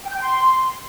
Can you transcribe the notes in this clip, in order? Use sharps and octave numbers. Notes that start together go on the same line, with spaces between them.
G5
G6
G5
C6